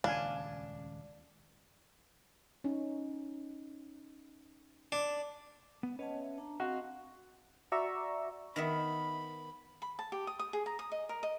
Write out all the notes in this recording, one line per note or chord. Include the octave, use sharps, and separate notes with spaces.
D#1 C#2 D4 F5 G#5
C#4 D#4
D4
B3
C#4 B4 C#5 D#5 F#5 A5
E5
D4 A5 A#5
C4 F#4 D#5 F5
F#4 D5 E5 A#5 C#6 E6
D#3 B3 E5 B5
B5
A5
G4
D#6
D#6
G#4
A#5
D#6
D#5
A#4
D#5